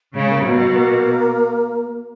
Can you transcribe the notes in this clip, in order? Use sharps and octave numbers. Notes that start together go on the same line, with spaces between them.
C#3 G#3
A#3
B2 F#3
F#3
A#3